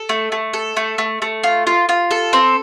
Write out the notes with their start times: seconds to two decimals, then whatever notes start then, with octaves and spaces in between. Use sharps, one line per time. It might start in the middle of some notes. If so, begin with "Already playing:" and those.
Already playing: A4
0.09 A3
0.32 A3
0.53 A4
0.77 A3
0.98 A3
1.22 A3
1.44 F4
1.67 F4
1.89 F4
2.11 A4
2.33 C4